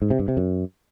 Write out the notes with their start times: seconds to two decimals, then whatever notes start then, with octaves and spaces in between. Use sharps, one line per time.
0.02 G#2
0.10 C3
0.19 G2
0.28 C3
0.37 F#2